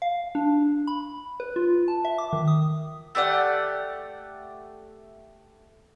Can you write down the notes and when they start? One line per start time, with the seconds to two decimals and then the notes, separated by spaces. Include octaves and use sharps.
0.02 F5
0.35 D4
0.87 B5
1.40 B4
1.56 F4
1.88 A5
2.05 E5
2.18 D6
2.33 D#3
2.48 D#6
3.15 A3 G4 D5 F#5